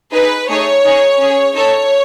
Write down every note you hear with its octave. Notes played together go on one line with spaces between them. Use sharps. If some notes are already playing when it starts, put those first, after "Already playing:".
D#4 G#4 B4
A3 D#4 G#4 C#5
D#4 G#4
C#4 G#4
D#4 A4 C#5